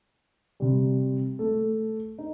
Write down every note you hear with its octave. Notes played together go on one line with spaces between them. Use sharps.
C3 G3
A3 A4
D#4